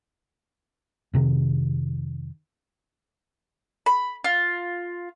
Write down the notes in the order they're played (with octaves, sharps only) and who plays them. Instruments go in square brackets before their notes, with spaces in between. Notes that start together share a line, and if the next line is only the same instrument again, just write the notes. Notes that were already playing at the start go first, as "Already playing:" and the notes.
[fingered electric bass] F2 C3 D#3
[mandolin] B5
F4